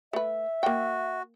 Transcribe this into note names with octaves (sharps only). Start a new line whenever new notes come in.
A3 B4 E5
A#3 F#4 G5